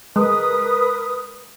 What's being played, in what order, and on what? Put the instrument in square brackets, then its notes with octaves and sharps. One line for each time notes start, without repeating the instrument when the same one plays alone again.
[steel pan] G#3 [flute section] A#4 B4 D#6